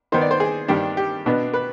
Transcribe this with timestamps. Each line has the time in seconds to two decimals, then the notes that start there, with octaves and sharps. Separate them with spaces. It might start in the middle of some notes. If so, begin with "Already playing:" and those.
0.12 D#3 B3 D#4 C5
0.21 D5
0.31 C5
0.40 G#4
0.68 G2 D#3 G3 D4 G4
0.97 G4
1.26 B2 B3 D4
1.54 B4